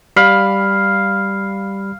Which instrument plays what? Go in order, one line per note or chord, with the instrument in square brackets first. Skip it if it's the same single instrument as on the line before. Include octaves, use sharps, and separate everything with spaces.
[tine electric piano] G3 B5 [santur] F5